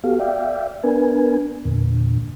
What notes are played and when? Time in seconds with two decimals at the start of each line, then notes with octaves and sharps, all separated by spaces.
0.04 B3 F#4 G4 A4 F5
0.20 D5 E5 F5 G5
0.84 B3 D4 A#4 B4 G#5
1.65 E2 A#2 D3